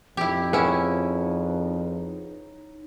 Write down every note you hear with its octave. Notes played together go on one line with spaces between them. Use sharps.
F2 D#4 E4 G4
C#4 E4 G#4 B4 F#5